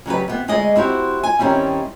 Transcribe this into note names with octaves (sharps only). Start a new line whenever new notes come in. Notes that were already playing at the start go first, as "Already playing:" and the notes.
C#3 F#3 G3 B4
C3 B3
D2 G#3 G#4 D5 D#5
C4 E4 F#4 G4 C5
G#5
D#3 G3 C4 C#4 E4